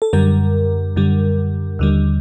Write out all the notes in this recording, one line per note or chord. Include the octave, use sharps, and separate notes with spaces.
A4
F#2 D3 G3 A#4
F#2 D3 G3
D#2 D3 G3